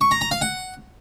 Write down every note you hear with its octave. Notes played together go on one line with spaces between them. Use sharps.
C#6
A#5
A#5
F5
F#5